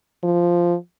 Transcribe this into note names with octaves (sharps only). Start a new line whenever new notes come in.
F3